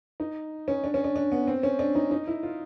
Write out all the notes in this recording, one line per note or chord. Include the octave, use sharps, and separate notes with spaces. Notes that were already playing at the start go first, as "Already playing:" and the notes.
D#4
C#4
D4
C#4
D4
D4
B3
C4
C#4
D4
D#4
D#4
E4
F4